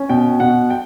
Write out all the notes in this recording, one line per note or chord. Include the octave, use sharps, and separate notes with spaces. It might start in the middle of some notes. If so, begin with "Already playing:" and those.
Already playing: C#4
B2 G5
B2 F#5
G5